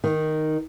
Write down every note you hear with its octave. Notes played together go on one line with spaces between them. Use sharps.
D#3